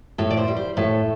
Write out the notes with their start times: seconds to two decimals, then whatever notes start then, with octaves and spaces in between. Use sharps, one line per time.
0.18 A2 A4
0.30 D5
0.37 C5
0.48 G3
0.57 C5
0.77 A2 A4